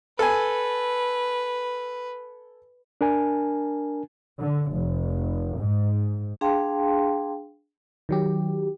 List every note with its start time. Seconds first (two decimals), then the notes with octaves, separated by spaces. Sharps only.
0.19 A4 B4 G#5
3.01 D4 A#4 G#5
4.40 D3
4.72 F1
5.58 G#2
6.41 D4 G#4 F5 G5 A5 C6
8.09 D#3 F#3 G4